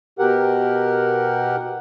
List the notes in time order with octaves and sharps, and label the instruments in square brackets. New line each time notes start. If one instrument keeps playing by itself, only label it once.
[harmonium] B2 G4 A#4 F#5